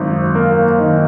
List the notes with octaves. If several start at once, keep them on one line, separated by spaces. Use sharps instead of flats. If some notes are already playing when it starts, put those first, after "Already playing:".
Already playing: G#1 F#2
A#3
D#3